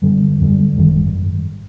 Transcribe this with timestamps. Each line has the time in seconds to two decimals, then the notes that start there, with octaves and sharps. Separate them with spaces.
0.02 F#2 D3 G3
0.40 F#2 D3 G3
0.78 G#1 F#2 D#3 G3